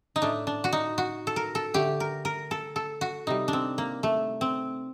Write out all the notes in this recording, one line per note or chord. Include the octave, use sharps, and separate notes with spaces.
D#4
A2 A3 D4
D4
F#4
D#4
F#4
A4
A#4
A4
D3 A3 G4
A#4
A#4
A4
A4
F#4
C3 G3 D#4
D4
C4
A#3
A3
C4